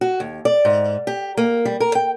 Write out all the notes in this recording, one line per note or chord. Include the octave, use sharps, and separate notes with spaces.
F#4
D#2
D5
G#2
G4
A#3
G3
A#4
G5